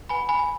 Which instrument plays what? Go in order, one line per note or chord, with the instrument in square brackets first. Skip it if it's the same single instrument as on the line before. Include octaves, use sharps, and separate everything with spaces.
[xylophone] B4 F#5 G#5 B5
G#5 B5
G#5